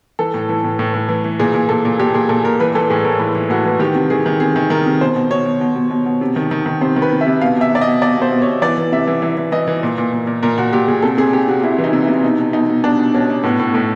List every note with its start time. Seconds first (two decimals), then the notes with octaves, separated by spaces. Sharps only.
0.19 E3 A4
0.34 A2
0.49 E3
0.64 A2
0.79 A2
0.94 A2
1.09 E3
1.24 E3
1.39 A#2 G#4
1.54 A#2
1.69 A#2 A4
1.85 A#2
1.99 A#2 G4
2.14 A#2 G#4
2.29 A#2 A4
2.44 A#2 A#4
2.60 E3 B4
2.75 E3 A4
2.90 A2 G#4
3.04 A2 A#4
3.19 E3 B4
3.35 E3
3.50 A2 F#4
3.65 E3
3.80 D#3 G4
3.95 C3
4.10 D#3 G#4
4.26 D#3
4.40 C3 G#4
4.56 D#3
4.70 D#3 A#4
4.86 C3
5.01 B2 C5
5.16 B2
5.31 B2 C#5
5.45 B2
5.61 B2
5.76 B2
5.90 B2
6.06 B2
6.21 C3
6.36 D#3
6.51 D#3
6.66 D#3
6.81 C3 C5
6.96 D#3
7.02 B4
7.12 C3
7.21 E5
7.27 C3
7.41 B2 F5
7.56 B2 E5
7.71 B2 D5
7.81 D#5
7.87 B2
8.02 B2 D5
8.17 B2 C5
8.32 B2
8.42 C#5
8.47 B2
8.62 E3 D5
8.77 E3
8.92 C3 E5
9.07 E3
9.22 E3 E5
9.37 E3
9.52 E3 D#5
9.68 E3
9.83 A#2
9.98 A#2
10.13 A#2
10.27 A#2
10.43 A#2 A#4
10.58 A#2 F#4
10.73 A#2 G4
10.88 A#2 G#4
11.02 C3 A4
11.18 C3 G#4
11.33 C3 G4
11.48 C3 F#4
11.63 C3 E4
11.78 E3
11.84 D#4
11.93 C3
12.03 E4
12.08 C3
12.23 B2 D#4
12.39 B2
12.53 B2 D#4
12.69 B2
12.84 B2 D4
12.99 B2
13.14 B2 C#4
13.30 B2
13.43 A2 B3
13.60 A2
13.74 A2 A3